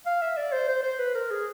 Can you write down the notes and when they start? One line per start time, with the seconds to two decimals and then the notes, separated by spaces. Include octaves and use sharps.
0.06 F5
0.21 E5
0.37 D5
0.52 C5
0.69 C5
0.83 C5
0.99 B4
1.15 A#4
1.30 G#4